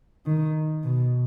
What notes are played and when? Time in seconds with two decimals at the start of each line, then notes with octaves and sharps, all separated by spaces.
0.26 D#3
0.84 B2